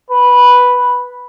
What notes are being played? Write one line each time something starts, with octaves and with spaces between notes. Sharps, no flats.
B4